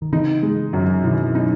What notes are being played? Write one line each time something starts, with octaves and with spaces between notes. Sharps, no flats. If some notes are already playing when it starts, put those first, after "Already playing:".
D#3
C#3 E3 D#4
G#3
F#2
B2 D#3 E3
D#4